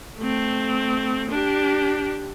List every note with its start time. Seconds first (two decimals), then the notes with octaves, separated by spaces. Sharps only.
0.18 A3 C4
1.30 D4 G4